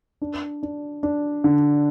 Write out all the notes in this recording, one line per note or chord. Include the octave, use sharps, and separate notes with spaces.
D4
D4
D4
D3